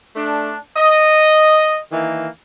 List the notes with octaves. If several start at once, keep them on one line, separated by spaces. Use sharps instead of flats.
A3 D4
D#5
D#3 E3 A#3